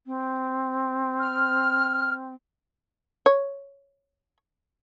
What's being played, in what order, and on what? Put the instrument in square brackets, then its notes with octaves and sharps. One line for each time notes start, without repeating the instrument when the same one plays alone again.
[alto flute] C4
[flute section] F6
[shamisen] C#5